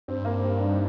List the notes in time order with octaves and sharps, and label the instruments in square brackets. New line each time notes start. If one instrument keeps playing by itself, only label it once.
[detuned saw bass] G2 [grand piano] C4
[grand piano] A#3
C4
D4
D#4